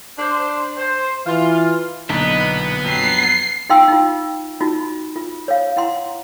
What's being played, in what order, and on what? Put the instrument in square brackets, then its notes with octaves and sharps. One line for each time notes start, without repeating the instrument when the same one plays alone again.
[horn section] D4 C5
C5
[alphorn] E3 [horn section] F4
[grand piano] B1 D#4 [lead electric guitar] A#2 D3 [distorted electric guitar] B3
[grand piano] F2 F#3 [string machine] C7
[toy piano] D#4 F4 F5 G5 C6 E6
D#4 F4
D#4 F4 F#4
F4
C#5 F5
E4 F#5 A#5 C6